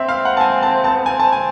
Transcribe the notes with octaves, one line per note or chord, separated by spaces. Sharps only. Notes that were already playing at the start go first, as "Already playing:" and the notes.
Already playing: C4 E5
F5
F#5
A5
G#5
A5
A5
B3
C4 G#5
A5
G#5